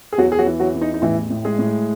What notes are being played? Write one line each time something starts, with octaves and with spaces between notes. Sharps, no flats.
G#4
E2 F#3 F#4
G#4
F#3 F#4
E3
F#3 F#4
E2
D#4
D#4
A1 E3 E4
A2
G#3 G#4
A2